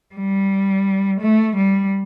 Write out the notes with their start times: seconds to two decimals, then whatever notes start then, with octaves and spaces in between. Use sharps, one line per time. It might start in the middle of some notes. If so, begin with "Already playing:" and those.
0.16 G3
1.21 A3
1.56 G3